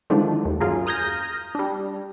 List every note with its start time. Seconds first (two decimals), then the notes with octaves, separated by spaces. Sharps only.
0.10 D3 D#3 F3 G#3 D4 E4
0.45 D#2
0.60 F#2 F4 G#4 A#5
0.86 A#5 D#6 F6 G6 G#6 A#6
1.55 G3 D4